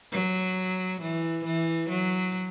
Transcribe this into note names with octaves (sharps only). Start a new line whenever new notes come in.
F#3
E3
E3
F#3